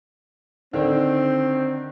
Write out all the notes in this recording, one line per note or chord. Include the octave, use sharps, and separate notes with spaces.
D3 D#3 C4